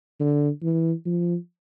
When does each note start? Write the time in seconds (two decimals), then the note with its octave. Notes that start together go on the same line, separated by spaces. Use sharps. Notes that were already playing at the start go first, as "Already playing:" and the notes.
0.20 D3
0.63 E3
1.06 F3